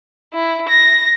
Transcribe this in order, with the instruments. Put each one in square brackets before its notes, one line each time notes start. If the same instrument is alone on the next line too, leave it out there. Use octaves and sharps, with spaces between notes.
[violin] E4
A#6